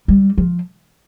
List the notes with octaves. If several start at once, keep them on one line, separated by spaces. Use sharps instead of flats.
G3
F3